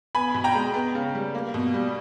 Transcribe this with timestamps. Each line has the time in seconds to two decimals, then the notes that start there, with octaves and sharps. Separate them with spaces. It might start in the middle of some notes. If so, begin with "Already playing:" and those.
0.15 B3 G#5 B5
0.34 B2
0.44 G5 A#5
0.55 G#3
0.74 B3
0.95 C#3
1.15 G3
1.35 A#3
1.54 B2
1.74 G3